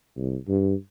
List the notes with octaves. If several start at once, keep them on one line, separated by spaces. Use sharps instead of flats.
C2
G2